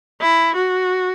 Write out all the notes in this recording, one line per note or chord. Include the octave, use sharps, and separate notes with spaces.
E4
F#4